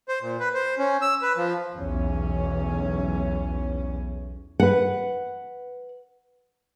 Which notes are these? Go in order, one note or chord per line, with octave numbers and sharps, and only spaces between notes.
C5
A#2
B4
C5
C#4
E6
B4
F3
B1 E2 C#4
B4 F#5